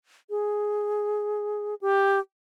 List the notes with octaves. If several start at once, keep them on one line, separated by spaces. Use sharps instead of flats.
G#4
G4